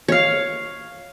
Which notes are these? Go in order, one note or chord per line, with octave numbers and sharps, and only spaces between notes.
C#5 F5